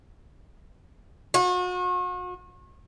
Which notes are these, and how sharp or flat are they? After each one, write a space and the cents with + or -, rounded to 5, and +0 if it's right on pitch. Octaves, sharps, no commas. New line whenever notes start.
F#4 -40